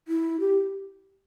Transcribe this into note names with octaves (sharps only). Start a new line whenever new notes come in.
E4
G4